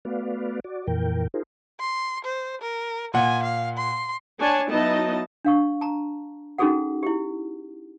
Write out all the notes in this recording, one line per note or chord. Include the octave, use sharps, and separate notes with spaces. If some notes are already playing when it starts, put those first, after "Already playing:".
A3 B3 F#4 B4 D5 F5
F#4 D5
F2 A#2 E3 A#4 G5
D#4 F4 G#4 A#4 C5
C6
C5
A#4
A#2 F#5 G#5
F5
C6
D4 C#5 G#5 A5
F#3 B3 D#4 E4 D#5 A5
D4 F5 C#6
A5 A#5
C#4 D#4 F#4 G#4 A4 F#5
E4 G4